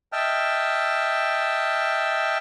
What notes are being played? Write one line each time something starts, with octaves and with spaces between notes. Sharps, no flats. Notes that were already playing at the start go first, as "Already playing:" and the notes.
D#5 E5 G5 A5 F6